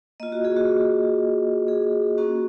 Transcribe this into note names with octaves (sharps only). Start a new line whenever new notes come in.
A#3 F4 D#5
F#4
G#4
F#4
G#4
A#3 C#4 F#4